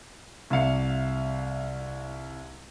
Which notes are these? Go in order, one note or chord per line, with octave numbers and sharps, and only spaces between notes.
C2 E5 F5 C#7